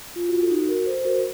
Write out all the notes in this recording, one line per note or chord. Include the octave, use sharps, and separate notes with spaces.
F4
F#4
F4
A4
D#4 F#4
F#4 A#4
A4 C5
C5
F#4 A#4